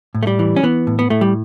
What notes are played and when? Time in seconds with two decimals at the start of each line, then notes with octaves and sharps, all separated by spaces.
0.15 A2
0.23 A3
0.27 G3
0.39 E3
0.56 C#4
0.63 E3 B3
0.87 A2
0.99 B3
1.10 A2 A3
1.21 G3